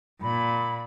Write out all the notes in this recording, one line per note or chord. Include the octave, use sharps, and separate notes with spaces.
A#2 B5